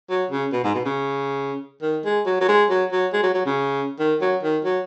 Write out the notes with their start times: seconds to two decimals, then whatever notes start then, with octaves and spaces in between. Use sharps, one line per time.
0.10 F#3
0.31 C#3
0.52 B2
0.64 G#2
0.75 B2
0.85 C#3
1.82 D#3
2.05 G#3
2.26 F#3
2.41 F#3
2.48 G#3
2.70 F#3
2.92 F#3
3.13 G#3
3.23 F#3
3.34 F#3
3.46 C#3
3.99 D#3
4.21 F#3
4.43 D#3
4.65 F#3